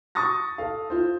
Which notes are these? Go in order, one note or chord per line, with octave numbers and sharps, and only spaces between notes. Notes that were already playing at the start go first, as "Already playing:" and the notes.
C#6 D#6 A6 A#6
A4 F5
F4 C5